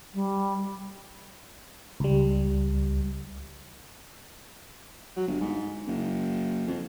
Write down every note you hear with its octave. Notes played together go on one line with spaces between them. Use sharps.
G3
C#2 G3
F#3
G1
G#2
F#1
F2